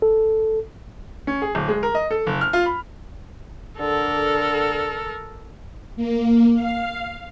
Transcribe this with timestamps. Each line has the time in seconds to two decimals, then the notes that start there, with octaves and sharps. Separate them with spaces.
0.02 A4
1.27 C#4
1.42 G#4
1.55 D1
1.68 G#3
1.83 A#4
1.95 D#5
2.11 A4
2.27 F#1
2.41 F6
2.53 F4
2.66 B5
3.79 D3 A4 A#4
5.96 A#3
6.54 F5